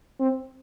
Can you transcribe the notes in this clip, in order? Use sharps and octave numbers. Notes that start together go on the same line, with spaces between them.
C4